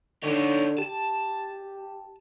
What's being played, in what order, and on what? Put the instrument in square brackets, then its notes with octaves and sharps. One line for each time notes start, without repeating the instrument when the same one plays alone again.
[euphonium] D3 [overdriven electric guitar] D#4 C#5
[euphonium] G4 [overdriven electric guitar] A5